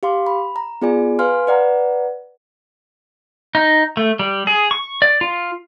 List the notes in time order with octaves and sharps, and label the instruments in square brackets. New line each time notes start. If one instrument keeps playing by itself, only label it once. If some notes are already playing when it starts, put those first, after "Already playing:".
[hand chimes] G4 F5 C6 D6
B5
A#5
B3 F4 G#4 D5 G#5
B4 F5 G#5 C6 F6
B4 D5 F#5 A#5
[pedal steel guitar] D#4
A3
G3
G#4
C#6
D5
F4